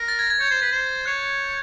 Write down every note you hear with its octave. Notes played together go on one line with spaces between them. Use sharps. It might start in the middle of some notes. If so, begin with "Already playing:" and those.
Already playing: A#4
A6
G#6
G#6
C#5 G6
C5
B4
C5
C#5 F#6